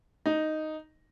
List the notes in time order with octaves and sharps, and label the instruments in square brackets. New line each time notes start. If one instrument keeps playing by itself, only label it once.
[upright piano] D#4